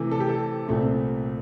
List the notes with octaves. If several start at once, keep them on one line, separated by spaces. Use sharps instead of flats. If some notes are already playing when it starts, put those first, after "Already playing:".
Already playing: C3 E3 A3
A4
G4
A4
C2 A#2 A3 C4